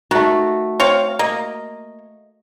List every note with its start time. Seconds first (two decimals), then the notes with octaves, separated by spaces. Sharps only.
0.11 D#3 A3 F#4
0.80 C4 C#5 F5
1.19 A#3 D#5